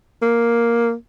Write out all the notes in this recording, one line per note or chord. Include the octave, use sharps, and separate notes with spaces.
A#3